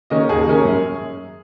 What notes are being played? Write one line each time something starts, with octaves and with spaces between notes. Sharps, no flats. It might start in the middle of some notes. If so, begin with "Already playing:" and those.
D#3 A#3 C#4 D#5
D#2 G#4
D#3 A#3 C#4
F#2